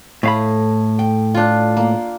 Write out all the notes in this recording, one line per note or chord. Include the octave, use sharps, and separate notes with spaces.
A2 A3 F5 B5
G5
D4 F4
A#3